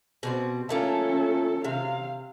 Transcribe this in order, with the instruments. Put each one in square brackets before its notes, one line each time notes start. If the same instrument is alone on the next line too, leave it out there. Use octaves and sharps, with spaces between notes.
[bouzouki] B2 G3 C4
[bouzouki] A3 A#3 F4 [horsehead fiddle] C#4 A4
[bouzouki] C3 [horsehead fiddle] F5